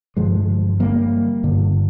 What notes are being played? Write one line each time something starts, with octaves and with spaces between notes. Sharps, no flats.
G2 D3 F3 G#3
G3 A#3
G2 D3